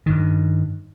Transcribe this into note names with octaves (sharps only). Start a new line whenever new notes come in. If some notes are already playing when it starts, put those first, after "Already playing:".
G2 D#3